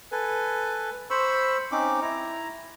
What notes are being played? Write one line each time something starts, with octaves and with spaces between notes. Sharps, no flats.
A4 B4 G#5
C5 B5 C#6 E6
C4 C#4 D#4 D6
E4 A#5